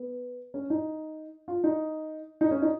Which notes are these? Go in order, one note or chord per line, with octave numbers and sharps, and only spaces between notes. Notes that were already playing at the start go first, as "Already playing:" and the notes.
Already playing: B3
C#4
D#4
F4
D#4
D#4
C#4
D#4